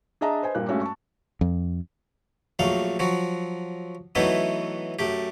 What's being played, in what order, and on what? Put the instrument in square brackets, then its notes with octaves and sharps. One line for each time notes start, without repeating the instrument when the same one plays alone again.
[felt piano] D4 G#4 D#5 E5 A5 A#5
B4 C5 D#5 G#5
G2 A#2 G3 A#3 F#6
G2 G#3 A3 C#4 F#4
A5 C#6
[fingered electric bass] F2
[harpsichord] A#1 F#3 A3 F5
F3 F#3 F#4
E3 F#3 A3 B3 D#4 E4
F#2 A3 G4